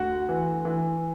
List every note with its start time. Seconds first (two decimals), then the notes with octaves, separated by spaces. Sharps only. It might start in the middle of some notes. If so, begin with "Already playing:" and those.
Already playing: D2 F#4 F#5
0.29 E3
0.65 E3